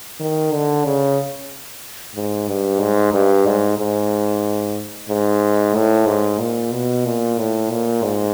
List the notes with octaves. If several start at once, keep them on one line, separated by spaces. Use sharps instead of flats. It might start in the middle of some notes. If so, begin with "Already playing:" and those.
D#3
D3
C#3
G#2
G2
G#2
G2
G#2
G#2
G#2
A2
G#2
A#2
B2
A#2
A2
A#2
G#2